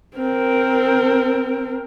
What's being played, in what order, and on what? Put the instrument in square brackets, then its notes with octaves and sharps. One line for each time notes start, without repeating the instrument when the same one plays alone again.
[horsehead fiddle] C4 A#4